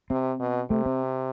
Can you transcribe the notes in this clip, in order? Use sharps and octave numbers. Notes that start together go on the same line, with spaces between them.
C3 C4
B2
C3 A3
C4